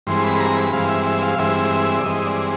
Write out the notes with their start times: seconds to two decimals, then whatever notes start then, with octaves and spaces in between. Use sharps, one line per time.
0.07 G2 E3 G#3 C4 C6
0.23 B5
0.40 A#5
0.56 B5
0.73 G2 E3 G#3 C4 F5
0.89 E5
1.06 E5
1.22 F5
1.38 G2 E3 G#3 C4 E5
1.98 D5
2.04 G2 E3 G#3 C4 D#5
2.26 D5